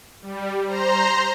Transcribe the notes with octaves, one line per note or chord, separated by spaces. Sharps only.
G3
C5 A#5 C6